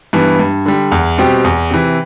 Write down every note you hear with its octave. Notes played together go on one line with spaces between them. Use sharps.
G2 E3 B3
G2
D3 G3
E2
B2 G3 C4 G4
E2
C3 E3